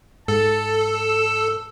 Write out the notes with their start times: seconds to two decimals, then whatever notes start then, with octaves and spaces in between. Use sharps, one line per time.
0.28 G#2 A4 A5
0.80 E6